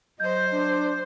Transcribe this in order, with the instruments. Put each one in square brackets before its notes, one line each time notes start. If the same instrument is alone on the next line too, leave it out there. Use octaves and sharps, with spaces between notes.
[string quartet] F#3 C5 [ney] D#5 [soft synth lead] G6
[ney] D4